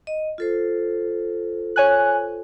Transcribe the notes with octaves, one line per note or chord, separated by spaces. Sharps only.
D#5
F4 A4 C5
C#5 G#5 F#6